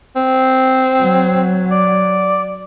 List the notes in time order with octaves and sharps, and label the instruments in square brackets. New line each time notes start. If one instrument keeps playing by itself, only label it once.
[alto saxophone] C4
[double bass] F#3
[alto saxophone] D5